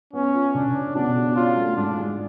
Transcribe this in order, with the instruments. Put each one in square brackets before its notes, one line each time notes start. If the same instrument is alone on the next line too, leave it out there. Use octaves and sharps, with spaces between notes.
[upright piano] B3 [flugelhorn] C#4
[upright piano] F4
[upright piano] C#3 [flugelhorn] D4
[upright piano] C#4
[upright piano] B2 [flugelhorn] D4
[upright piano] G#4
[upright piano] C#4 [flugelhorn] F4
[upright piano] A3
[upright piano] G#2 [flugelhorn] D4
[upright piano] G#3